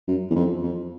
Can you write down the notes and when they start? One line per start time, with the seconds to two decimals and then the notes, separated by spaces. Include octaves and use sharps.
0.08 F#2
0.30 E2
0.36 F2
0.63 F2